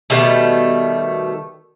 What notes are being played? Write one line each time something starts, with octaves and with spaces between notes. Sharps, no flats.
B2 D#3 G3 A3